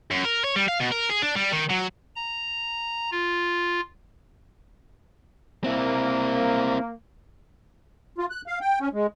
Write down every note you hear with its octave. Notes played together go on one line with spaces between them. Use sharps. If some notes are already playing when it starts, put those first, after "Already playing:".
F#2
A#4
C#5
G3
F5
B2
A#4
G#4
D4
G3
D#3
F#3
A#5
F4
A#3 C4 E4
F4
F#6
F5
G5
C#4
G#3